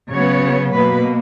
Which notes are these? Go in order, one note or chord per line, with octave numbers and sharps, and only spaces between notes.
C#3 F#3 B3 C#5
B2 A#3 B4